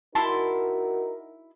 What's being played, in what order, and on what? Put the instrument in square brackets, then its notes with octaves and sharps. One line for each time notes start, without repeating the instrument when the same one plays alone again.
[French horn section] D#4 F#4 A#4 [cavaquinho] E4 A5 C6